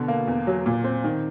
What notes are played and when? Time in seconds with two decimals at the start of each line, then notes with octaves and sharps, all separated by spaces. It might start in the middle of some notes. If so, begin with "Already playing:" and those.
Already playing: B2 D3
0.08 A#3
0.28 E2
0.47 F#3
0.66 A#2
0.84 C4
1.04 D#3